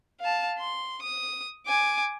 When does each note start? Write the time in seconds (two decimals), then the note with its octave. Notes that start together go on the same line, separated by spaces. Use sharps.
0.20 F5 A5
0.59 C6
1.02 D#6
1.66 G#5 D6